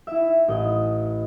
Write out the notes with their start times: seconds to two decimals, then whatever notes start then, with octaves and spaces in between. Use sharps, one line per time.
0.07 E4 E5
0.48 A1 D#5